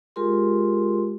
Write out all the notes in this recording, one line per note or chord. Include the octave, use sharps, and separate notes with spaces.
G#3 F4 G4 G#4 A#4 C6